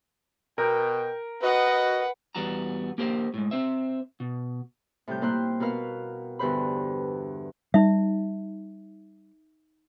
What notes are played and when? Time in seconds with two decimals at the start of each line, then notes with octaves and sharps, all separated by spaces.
0.58 B2 A#4 G5
1.42 F#4 B4 D#5 F#5
2.35 E2 G3 B3 F#4 A5 A#5
2.98 A#3 G4 A#4 C5
3.34 A2 G#3
3.51 C4 C5 E5
4.20 B2
5.07 A2 C3 G3 G6
5.21 A#2 A#3 E4 C5 G5 F#6
5.60 B2 F#4 A#4 B4 F5 F6
6.39 E2 G2 D3 B4 C5 B5
7.74 G3 D#4 E5